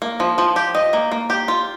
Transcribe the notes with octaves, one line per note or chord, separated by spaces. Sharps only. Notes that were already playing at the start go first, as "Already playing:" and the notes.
A#3
F3
F3
G4
D#5
A#3
A#3
G4
F4